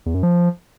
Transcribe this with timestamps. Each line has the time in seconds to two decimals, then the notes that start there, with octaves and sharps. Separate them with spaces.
0.06 E2
0.14 F#2
0.23 F3